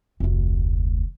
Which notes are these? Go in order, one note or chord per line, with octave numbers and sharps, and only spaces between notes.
F1 D2